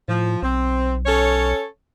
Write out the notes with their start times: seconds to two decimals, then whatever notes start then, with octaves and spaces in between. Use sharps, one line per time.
0.08 A2 F3
0.42 B1 C4
1.05 C#4 A4 C#5